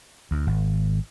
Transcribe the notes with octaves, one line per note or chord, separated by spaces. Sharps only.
D2
G#1